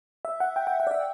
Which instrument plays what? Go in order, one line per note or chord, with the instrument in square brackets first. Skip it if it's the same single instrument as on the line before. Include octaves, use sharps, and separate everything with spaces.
[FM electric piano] E5
F#5
G5
G5
F#5
D5
E5